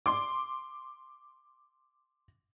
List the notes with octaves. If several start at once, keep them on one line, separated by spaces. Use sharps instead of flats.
C6 D6